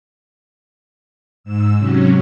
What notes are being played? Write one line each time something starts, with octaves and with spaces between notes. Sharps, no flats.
G#2 E6
C3 F#3 C#4